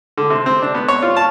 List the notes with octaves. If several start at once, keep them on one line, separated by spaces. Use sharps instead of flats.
D3
C3
C4
D4
B3
C#5
F4
A5